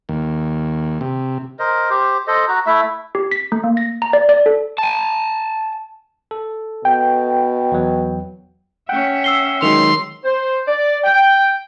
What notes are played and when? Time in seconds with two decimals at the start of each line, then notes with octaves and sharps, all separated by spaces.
0.09 D#2
1.01 C3
1.59 A#4 C5 D#5
1.90 G4 C5
2.27 A4 C5 D#5
2.48 F#4 A#5
2.67 A3 E4 E5
3.15 G4
3.31 B6
3.52 A3
3.64 A#3
3.77 A#6
4.02 A#5
4.13 D5
4.29 D5
4.46 A4
4.78 G#5 A5
6.31 A4
6.85 B2 G5
7.72 E2 F#3
8.89 C#4 E5 F#5 G5
9.24 E6 C7 G7
9.62 D#3 F#3 G#3 C6 F7
10.25 C5
10.68 D5
11.03 G5